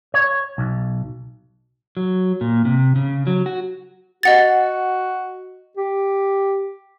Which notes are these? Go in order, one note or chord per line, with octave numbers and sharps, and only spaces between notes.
C#5
B1
F#3
A#2
C3
C#3
F#3
F#4
F#4 D#5 F#5 A6
G4